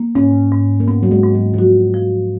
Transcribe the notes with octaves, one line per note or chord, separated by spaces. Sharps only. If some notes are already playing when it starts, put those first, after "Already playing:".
Already playing: A#3
G#2 C#4
G#2
A#3
G#2 B3
F#3
G#3
G#2
F#3
F3
F#3 F#4
F3